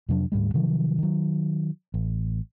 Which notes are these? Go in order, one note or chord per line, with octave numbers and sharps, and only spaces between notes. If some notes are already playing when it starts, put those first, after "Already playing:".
F2 C3 F#3 D4
D2 G#2 G3 G#3
C3 D#3 F3 F#3
D#3 F#3
A1